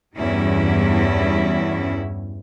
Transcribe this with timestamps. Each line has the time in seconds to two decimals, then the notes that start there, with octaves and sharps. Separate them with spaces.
0.17 E2 G2 G3 C#4 E4 F#4